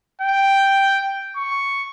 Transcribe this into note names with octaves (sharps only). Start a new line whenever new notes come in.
G5
C#6